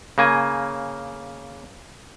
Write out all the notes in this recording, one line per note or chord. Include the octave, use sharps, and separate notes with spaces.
C#3 A#3 G#5